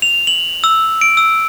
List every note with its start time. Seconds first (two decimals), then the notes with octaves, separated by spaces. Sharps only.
0.02 F7
0.27 F#7
0.64 E6
1.01 D7
1.17 E6